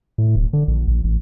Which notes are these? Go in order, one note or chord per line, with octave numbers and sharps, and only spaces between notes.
A2
D1
D3
A#1
A#1
A1